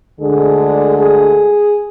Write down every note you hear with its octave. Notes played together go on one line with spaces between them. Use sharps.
D2 D3 G#3 D4 G#4
G#4